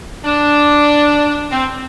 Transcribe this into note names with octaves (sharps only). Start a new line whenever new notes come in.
D4
C4